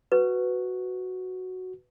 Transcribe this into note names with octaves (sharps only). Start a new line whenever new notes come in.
F#4 B4